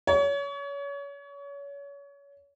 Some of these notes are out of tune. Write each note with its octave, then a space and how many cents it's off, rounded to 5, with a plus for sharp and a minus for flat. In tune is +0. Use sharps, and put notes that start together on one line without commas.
C#5 +30